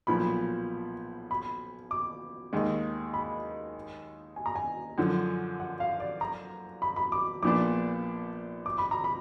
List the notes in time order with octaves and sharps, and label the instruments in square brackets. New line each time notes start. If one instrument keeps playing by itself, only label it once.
[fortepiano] B1 A#2 F3 B3 [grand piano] B5
[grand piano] B5
D6
[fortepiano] D#2 D#3 G#3
[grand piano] B5
G#5
A#5
G#5
[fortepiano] F#2 D3 F3
[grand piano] F#5
F5
D5
A#5
B5
B5
D6
[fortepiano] A#1 A#2 F3 B3 D4 [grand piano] D6
[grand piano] D6
B5
A#5
B5